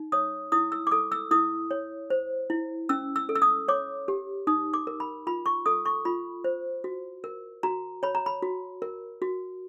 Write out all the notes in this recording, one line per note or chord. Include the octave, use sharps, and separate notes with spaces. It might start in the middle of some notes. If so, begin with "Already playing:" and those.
Already playing: D#4
C#5 D#6
E4 D#6
E6
D6
A4 D#6
E6
E4 D#6
C#5
C5
E4
C#4 E6
E6
A4
E6
D#6
C#5 D6
G4
D#4 D#6
D6
A#4
B5
F4 B5
C#6
A4 D#6
C#6
F4 B5
C5
F#4
A#4
F#4 A#5
C#5 B5
A#5
B5
F#4
A#4
F#4